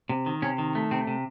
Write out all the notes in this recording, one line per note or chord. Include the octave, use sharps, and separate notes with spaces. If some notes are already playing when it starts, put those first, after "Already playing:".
C3
D#3
C3 C#4
D#3
A3
C3 C4
C3